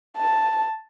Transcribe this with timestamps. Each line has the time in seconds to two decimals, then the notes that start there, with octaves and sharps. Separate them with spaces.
0.17 A5